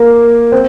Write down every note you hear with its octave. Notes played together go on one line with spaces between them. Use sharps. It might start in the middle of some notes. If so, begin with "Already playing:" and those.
Already playing: A#3
C4